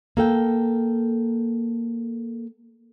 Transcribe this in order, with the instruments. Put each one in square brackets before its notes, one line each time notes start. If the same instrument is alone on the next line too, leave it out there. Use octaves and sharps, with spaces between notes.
[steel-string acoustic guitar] A#3 A4 G5